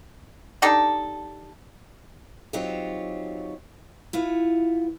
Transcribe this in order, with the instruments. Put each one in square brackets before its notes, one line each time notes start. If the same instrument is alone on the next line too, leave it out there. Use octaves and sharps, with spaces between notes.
[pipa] D4 D#4 G4 A4
[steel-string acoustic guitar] F#3 C4 D#4 F4 G4 C#5
E4 F4 B4 F#5